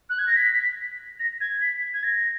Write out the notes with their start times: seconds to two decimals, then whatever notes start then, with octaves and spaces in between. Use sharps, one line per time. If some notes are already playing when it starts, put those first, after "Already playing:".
0.10 F#6
0.19 G#6
0.27 A#6
0.37 B6
1.20 A#6
1.41 G#6
1.62 B6
1.94 G#6
2.04 A#6